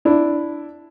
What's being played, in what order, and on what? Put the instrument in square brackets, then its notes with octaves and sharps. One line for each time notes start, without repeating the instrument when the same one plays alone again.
[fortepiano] D4 E4